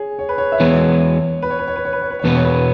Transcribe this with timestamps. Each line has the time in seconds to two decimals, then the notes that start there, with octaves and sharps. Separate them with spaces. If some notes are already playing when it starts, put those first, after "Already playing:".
Already playing: G#4 C#5
0.19 C#5
0.29 B4
0.38 C#5
0.52 E5
0.60 E2 E3 G#3 B3 C#5
1.42 B4
1.50 C#5
1.59 B4
1.68 C#5
1.76 B4
1.85 C#5
1.93 B4
2.02 C#5
2.10 B4
2.19 C#5
2.24 E2 B2 B3 B4
2.36 C#5
2.45 B4